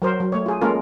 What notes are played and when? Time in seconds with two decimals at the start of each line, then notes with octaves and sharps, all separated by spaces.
0.02 F#3 A#4 C5
0.20 F#3
0.32 A3 C#5
0.46 F4 G#4
0.61 G#3 A#3 C#4 F4 A4 A#4